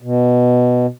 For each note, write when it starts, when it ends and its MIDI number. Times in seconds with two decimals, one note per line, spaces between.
0.02 0.86 47